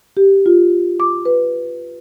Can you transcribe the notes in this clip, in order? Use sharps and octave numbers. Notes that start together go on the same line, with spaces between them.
G4
F4
D6
B4